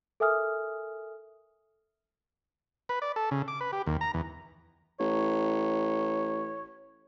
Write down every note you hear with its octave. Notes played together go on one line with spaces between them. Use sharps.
A4 A#4 E5 G#5 D#6 F6
B4
D5
A4
C#3
D6
B4
G4
D#2
A#5
E2
A1 C#5